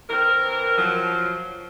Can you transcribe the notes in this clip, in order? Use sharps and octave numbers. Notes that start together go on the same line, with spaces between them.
E3 C4 A#4
F3 F#3